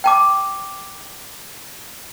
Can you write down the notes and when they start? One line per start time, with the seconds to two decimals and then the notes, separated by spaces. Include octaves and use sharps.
0.04 G5 A5 D6